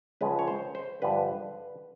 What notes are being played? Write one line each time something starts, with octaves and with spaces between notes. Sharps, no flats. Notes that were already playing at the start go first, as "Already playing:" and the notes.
C#2 C#3 F3 G#3 B4
C#5
C5
C5
G2 D3 F3 G#3 B4